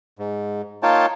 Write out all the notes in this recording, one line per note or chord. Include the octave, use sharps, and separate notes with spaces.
G#2
A#3 D#4 F4 C#5 G5 A5